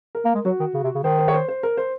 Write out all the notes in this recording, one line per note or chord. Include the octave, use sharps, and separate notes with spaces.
A#4
A#3
G#3
F#3 F#4
D#3
C#3
C3
C#3
D#3 C5
C5
C#5
C5
C5
A#4
C5